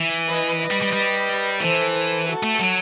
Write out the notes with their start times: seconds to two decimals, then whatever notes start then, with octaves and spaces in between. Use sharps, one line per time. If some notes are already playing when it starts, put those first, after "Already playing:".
Already playing: E3
0.26 B4 D#5
0.59 B4 D#5
0.71 G3
0.82 G3
0.93 G3
1.60 E3 A4 C5
2.26 F#4 A4
2.43 A3
2.60 F#3